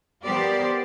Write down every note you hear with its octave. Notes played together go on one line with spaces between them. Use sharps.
B3 G4 A#4 C5 D5